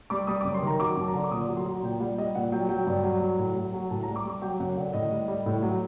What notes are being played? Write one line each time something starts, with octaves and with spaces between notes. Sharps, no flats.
G3 D6
G3 D#6
D6
F#2
C6
D#3
A#5
F#3 D6
F#2 A5
A#5
D3 C6
D6
A#2 D#6
F#3
C6
F#3 A#5
A#2 G5
G3 F#5
G3 D#5
A#2 F#5
F#3 G5
F#3 G5
G2
F#3
F#3
A2
F#3
F#3
A2 A5
A#5
G3
D6
G3
D6
F#3 G5
F#2 F#5
D3 F#5
A2 D#5
G3
G3
A2
F#3